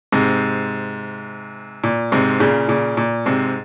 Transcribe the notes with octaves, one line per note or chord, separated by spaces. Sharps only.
G#2 C3
A#2
G#2 C3
A#2 C#3
A#2 C#3
A#2
G#2 C3